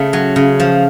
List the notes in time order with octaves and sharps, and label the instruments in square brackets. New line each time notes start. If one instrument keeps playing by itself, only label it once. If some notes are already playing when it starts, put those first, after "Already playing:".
Already playing: [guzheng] C#3 A3
F#3
C#3
F3